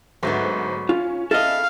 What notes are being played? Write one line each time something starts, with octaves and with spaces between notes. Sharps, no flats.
D2 G#2 F#3 A3 B3 C5
C#4 F4
E4 A4 D#5 F5